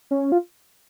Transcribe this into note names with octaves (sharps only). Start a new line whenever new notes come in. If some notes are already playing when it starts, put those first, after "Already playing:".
C#4
F4